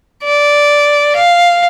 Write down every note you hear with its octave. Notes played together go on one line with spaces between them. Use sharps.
D5
F5